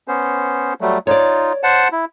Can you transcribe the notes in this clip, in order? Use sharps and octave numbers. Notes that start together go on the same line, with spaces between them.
B3 C#4 C5
F#3 G3 A3
D#4 F4 C#5 D5
C5 F#5 A5
E4